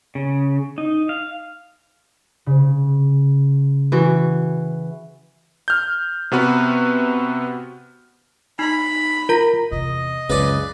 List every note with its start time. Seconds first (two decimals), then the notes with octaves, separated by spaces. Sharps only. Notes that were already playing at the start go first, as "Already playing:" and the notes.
0.15 C#3
0.78 D#4
1.09 F5
2.46 C#3
3.92 E3 F#4
5.68 F6 G6
6.31 C3 B3 F#4 B4
8.59 D#4 B5
9.29 F4 A#4 A#5 A#6
9.71 E2 C3 D#5
10.30 C#2 F#2 C#3 B4 D5